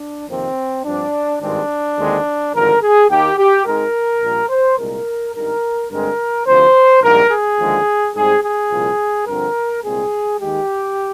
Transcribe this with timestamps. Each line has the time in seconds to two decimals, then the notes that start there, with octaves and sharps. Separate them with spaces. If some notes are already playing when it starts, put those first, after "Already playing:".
Already playing: D4
0.28 F2 C3 D#3 A#3 C4
0.85 G2 F3 C4 D4
1.41 G#1 G2 D#3 G#3 C4 D4
1.98 D#2 D3 G#3 C4
2.54 G#1 G2 D3 F3 A#4
2.82 G#4
3.10 D#2 D#3 A#3 G4
3.37 G4
3.65 G#1 G#2 D#3 G#3 A#4
4.22 A#1 A#2 G3
4.49 C5
4.78 C2 A#2 G#3 A#4
5.35 G#1 G2 D#3 A#4
5.91 G2 D3 G#3 C4 A#4
6.47 D2 C3 F3 C5
7.02 A#1 G#2 G3 A#3 A#4
7.30 G#4
7.59 D#2 D3 F3 G#3
8.15 G#2 G3 C4 G#4
8.43 G#4
8.71 C2 A#2 F3
9.27 G2 D3 F3 C4 A#4
9.84 C2 A#2 G#3 C4 G#4
10.40 D#2 D#3 G#3 G4